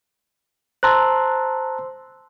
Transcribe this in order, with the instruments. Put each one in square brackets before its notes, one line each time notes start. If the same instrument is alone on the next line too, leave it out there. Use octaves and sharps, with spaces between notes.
[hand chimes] C5 C6 E6 [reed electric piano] A5 A#5 F#6